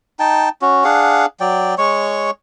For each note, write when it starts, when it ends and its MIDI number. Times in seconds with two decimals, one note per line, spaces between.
0.20 0.49 63
0.20 0.49 79
0.20 0.49 81
0.62 0.84 61
0.62 0.84 66
0.84 1.26 62
0.84 1.26 68
0.84 1.26 77
0.84 1.26 78
1.40 1.75 54
1.40 1.75 74
1.40 1.75 79
1.78 2.31 56
1.78 2.31 73
1.78 2.31 85